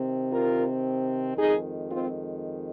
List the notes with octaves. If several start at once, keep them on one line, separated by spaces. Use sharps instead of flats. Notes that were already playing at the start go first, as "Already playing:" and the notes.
Already playing: C3 D#3 C4
F4 A#4
F2 D#3 G#3 D#4 G#4
C4 F4